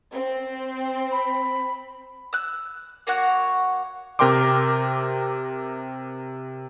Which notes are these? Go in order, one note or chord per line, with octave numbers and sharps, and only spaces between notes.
C4
B5
E6 F#6
A#3 F#4 C#5 F#5
C3 A#4 G5 C6 D6